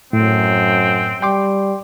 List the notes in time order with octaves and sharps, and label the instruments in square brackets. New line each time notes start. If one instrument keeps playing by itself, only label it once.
[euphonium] F#2 [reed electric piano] A2 [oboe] C4
[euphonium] G3 [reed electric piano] G5 C6 D6